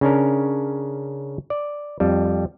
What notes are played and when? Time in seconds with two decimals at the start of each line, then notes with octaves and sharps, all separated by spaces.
0.01 C#3 C#4 D4 A#4
1.50 D5
2.00 F2 G3